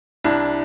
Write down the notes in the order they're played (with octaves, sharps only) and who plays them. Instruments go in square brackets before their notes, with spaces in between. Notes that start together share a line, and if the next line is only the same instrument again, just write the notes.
[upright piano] C2 D4 E4